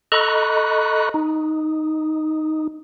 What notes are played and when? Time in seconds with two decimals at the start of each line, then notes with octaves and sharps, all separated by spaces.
0.12 A4 D#5 A#5 B5 C#6 F#6
1.14 D#4